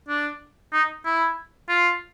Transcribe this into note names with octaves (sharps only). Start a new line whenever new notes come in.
D4
D#4
E4
F4